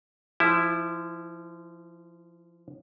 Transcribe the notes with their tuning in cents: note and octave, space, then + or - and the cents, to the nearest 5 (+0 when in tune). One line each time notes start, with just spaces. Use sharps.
F3 -25 E4 +0